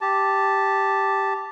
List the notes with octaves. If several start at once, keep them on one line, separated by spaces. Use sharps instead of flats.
G4 A5